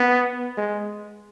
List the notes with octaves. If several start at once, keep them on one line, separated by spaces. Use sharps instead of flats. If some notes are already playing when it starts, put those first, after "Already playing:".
Already playing: B3
G#3